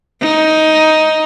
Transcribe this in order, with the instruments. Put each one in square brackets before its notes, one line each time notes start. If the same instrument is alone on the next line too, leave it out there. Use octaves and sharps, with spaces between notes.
[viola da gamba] D#4